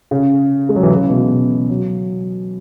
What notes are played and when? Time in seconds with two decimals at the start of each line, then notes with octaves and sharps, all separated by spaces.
0.11 C#3
0.69 G#3
0.76 F#3
0.83 E3
0.90 C#3
1.10 B2
1.30 C#3
1.70 F#3